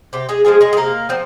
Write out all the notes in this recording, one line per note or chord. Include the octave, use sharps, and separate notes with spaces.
C3 G4
G#3 G#4
F3 G#3 C4 F4 G#4
G#3 G#4
G#4
C3 A#3 A#4
F3 C4